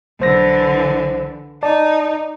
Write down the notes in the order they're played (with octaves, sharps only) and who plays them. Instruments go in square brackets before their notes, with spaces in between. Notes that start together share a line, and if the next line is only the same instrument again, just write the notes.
[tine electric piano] B1 C5 A#6 [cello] D3 E3
[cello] D#4 [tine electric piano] D5 A5